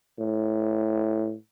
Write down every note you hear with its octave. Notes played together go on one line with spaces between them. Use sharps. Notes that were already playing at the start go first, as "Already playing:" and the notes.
A2